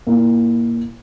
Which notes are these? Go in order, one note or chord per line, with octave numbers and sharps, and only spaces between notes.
A#2 A#3 E4